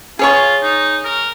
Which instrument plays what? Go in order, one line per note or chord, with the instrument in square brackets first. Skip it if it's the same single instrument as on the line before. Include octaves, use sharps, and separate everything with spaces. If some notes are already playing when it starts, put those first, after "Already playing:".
[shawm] F4 [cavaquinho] G#4 C#5 C#6
[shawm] D#4
A#4